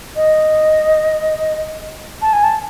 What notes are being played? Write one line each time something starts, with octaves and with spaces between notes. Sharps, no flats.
D#5
A5
G#5
A5